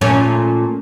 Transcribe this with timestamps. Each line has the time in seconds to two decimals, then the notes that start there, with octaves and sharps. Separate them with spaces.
0.01 A#2 A3 C#4